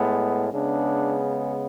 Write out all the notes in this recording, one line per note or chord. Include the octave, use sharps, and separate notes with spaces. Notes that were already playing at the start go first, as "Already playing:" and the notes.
Already playing: A2 G#3 B3
C#3 G#3 B3 D4